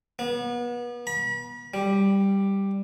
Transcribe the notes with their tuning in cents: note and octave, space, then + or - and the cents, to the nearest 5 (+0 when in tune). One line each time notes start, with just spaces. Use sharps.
B3 -35
B5 -40
G3 +5